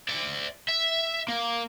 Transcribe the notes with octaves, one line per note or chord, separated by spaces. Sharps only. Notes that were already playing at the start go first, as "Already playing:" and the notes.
D5 E5
E5
A#3